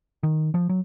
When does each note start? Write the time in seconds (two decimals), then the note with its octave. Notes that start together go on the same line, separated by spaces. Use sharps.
0.23 D#3
0.54 F3
0.69 F#3